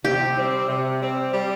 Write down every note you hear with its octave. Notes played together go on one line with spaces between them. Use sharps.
C3 G4
G3 C4
C3
G3 C4
G3